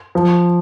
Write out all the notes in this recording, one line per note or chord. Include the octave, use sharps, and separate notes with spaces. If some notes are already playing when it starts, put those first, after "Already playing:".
F3